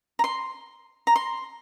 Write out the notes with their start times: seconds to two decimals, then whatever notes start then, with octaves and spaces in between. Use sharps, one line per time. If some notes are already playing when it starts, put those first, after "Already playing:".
0.19 A#5
0.24 C6
1.07 A#5
1.16 C6